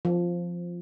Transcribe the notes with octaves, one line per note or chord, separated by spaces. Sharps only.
F3